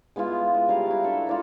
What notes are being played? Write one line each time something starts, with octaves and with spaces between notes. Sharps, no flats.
G#3 B3 E4 F4
D#5
G3 A#4 E5 F5
E4 F#4
D4 A4 E5
F4 D5 A#5